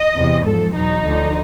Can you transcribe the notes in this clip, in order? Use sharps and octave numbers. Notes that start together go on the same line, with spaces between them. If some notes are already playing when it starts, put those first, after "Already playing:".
Already playing: D#5
E2 C3 E3
G#2 F3 A4
E2 B2 F#3 D#4
D2 D3 F3